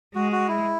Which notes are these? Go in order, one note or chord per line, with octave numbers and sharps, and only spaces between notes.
G#3 F#4
F#4
E4